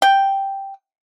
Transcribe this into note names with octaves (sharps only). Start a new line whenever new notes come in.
G5